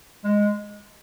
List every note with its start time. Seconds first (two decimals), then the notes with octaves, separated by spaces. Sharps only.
0.24 G#3